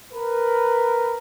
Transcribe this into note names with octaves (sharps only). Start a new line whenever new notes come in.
A#4 B4